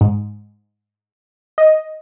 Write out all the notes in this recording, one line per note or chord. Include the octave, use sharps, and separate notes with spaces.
G#2
D#5